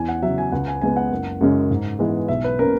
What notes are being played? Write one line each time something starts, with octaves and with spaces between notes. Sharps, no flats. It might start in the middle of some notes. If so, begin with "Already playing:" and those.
Already playing: E2 G#5
F#5
C#3 F#3 E5
G#5
C#2 F#5
G#5
C#3 G#3 B3 G#5
F#5
F#1
F#2 C#3 G#3 C#4
G#2
E3 G#3 B3
B1 E5
B4
B2 A#3 C#4 A#4